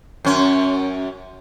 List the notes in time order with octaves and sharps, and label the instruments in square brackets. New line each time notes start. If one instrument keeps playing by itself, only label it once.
[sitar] F#2 C#4